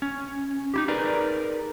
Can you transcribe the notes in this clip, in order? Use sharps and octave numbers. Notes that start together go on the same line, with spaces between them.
C#4
D#4 E4 G4
D#4 G#4 A#4 B4 D5